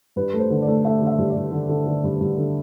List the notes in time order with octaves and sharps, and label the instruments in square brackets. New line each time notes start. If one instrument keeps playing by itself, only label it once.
[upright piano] G2 B4
A3
C5
D3
D5
A3
A3 E5
D3
E5
G2
D5
G2
D3
D3
D3
G2
G2
D3